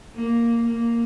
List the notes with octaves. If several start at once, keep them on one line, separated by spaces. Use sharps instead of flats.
A#3
A#3